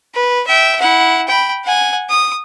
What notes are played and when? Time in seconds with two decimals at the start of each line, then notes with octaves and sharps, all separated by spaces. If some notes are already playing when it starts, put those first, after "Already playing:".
0.15 B4
0.47 E5 G5
0.80 E4 F#5
1.28 G5 B5
1.64 F#5 G#5
2.10 D#6